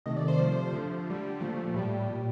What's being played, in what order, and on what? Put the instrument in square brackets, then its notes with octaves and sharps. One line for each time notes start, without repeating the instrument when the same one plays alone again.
[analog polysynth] C3 D#3 A3 D#5
D5
C5
C3 F3 A3 C5
D3 F3 A3
D3 G3
A#2 F3 A3
A2 G3
A#2 G3